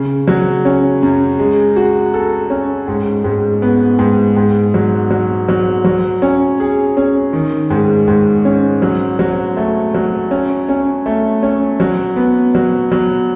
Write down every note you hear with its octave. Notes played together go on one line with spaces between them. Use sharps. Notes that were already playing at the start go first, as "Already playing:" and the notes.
Already playing: C#3
F#3
C#4
F#2
G#3
F#4
A4
C#4
G#2
G#2
B3
G#2
G#2
F#3
F#3
F#3
F#3
C#4
G#4
C#4
D#3
G#2
G#2
C#4
F#3
F#3
A3
F#3
C#4
C#4
A3
C#4
F#3
B3
F#3
F#3